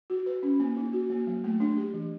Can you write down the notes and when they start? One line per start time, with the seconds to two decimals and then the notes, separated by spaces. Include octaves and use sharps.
0.10 F#4
0.26 B4
0.43 C#4
0.60 A#3
0.77 D#4
0.93 F#4
1.10 A#3
1.27 F#3
1.44 A3
1.60 D4
1.77 G4
1.94 E3